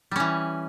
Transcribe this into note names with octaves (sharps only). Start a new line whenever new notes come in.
E3 G3 C#4